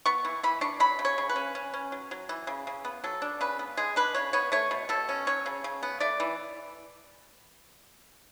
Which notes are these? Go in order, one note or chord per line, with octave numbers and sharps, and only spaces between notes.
B3 C#6
E3
E3 B5
D4 C#6
F#3 B5
C#3
C#5
C#3
B4
C#4
C#4
C#4
F#3
F#3
E3
C#3
C#3
B3
F#3 A4
D4
C#3 B4
B3
G#3 G#4
D4 B4
C#3 C#5
B3 C#5
A3 C#5
B2
B2 A4
C#4
F#3 C#5
C#3
C#3
B3
A3 D5
E3